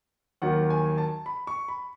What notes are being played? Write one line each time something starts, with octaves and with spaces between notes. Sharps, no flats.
D#2 D#3 F#3 F#5
G#5
A5
B5
C#6
B5